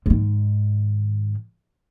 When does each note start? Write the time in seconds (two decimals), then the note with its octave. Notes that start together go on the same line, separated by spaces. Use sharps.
0.06 G#2 D#3